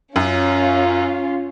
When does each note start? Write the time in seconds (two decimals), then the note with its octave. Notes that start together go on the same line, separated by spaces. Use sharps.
0.16 F#2 C#4 F4